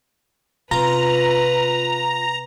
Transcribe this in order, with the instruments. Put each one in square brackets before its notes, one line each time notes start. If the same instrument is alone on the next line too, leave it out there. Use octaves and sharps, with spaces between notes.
[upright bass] C3 [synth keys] F4 [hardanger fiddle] B4 [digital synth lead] A#5